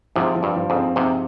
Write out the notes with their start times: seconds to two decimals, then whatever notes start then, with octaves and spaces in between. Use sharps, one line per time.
0.16 G#2 C3 F3
0.36 F3
0.43 G2
0.56 F3
0.70 F2 G#2
0.76 C4
0.96 G#2 C3 C4